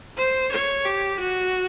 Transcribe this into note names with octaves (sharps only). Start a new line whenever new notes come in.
C5
C#5
G4
F#4